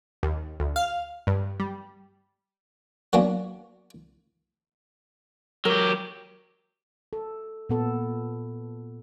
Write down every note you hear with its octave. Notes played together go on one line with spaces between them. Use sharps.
D#2
D2
F5
G2
G3
F#3 A#3 B3 C#4 D4 F#4
F#3 G4 A#4
A4
A#2 B3 A4